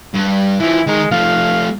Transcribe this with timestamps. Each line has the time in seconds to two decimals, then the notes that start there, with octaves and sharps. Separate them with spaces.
0.14 G2
0.60 E3 F3 E4
0.87 D#3 G#3 A#4
1.11 F3 A3 F5